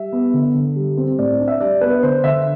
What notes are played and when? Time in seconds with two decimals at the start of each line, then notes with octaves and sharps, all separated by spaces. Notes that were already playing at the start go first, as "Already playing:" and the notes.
Already playing: G3 E5
0.12 B3
0.34 D3
0.54 D3
0.76 G3
0.97 C4
1.18 A2 D5
1.40 D4
1.48 E5
1.60 G3 D5
1.81 B3 B4
2.03 D3 C5
2.24 D3 E5